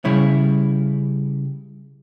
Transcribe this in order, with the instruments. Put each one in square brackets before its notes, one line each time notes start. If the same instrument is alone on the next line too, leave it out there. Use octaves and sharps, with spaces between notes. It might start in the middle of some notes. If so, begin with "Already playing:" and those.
[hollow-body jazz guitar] C#3 G3 E4 C#5